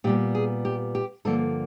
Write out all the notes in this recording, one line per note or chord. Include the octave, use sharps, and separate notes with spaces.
A#2 G3 B3 G4
G#4
G4
G4
G2 D3 F3 A#3 A4